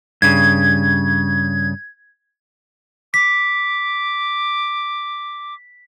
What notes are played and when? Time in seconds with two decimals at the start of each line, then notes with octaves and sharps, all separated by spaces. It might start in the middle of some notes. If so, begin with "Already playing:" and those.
0.22 G2 C#3 G#6
3.14 D6 B6